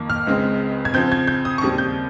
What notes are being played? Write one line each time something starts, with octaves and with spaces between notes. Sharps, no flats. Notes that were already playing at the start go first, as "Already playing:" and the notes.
Already playing: F2 D#3 A#3
F6
C#2 C#3 G#3 C4
G#6
C#3 F3 C4 G6
G#6
G6
D#6
C#6
D#2 C#3 G3 C4 D#6
G6